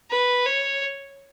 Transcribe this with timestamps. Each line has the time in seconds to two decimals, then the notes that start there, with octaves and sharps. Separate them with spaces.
0.11 B4
0.46 C#5